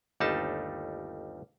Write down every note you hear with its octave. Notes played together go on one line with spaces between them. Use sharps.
G1 D#2 G3 A3 D#4 A5